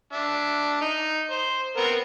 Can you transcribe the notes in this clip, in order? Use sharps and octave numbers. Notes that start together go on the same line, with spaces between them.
D4 E5
D#4
C5
B3 C4 A#4